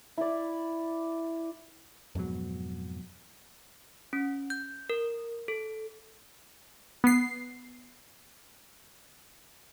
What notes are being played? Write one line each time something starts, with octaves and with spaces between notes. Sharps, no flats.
E4 D5
F2 G#2 B2 F#3
C#4
G6
A#4
A4
B3 C7